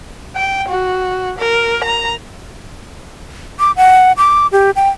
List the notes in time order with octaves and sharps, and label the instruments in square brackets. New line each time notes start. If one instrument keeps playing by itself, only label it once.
[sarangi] G5
F#4
A#4
A#5
[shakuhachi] D6
F#5
D6
G4
G5